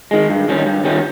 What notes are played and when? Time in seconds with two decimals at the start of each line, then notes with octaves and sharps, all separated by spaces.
0.11 D#3 G#3
0.30 G2
0.48 D#3 G3 C#4
0.66 G2
0.85 D#3 G3 C#4